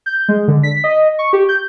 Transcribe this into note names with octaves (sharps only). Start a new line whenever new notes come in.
G6
G#3
D3
B6
D#5
C#6
G4
G6